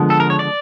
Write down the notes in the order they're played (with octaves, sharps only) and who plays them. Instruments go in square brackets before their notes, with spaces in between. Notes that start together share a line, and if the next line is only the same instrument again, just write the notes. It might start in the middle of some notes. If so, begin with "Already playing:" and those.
Already playing: [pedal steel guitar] D3 F3 G#3 B3
A4
A#4
C#5
D5